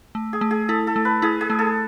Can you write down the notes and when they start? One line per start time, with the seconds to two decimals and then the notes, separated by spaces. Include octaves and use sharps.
0.15 A3
0.33 G#4
0.41 A3
0.51 G#4
0.68 E4 A4
0.87 A4
0.96 A3
1.05 B4
1.22 E4 G#4
1.41 G#4
1.50 A3
1.59 A4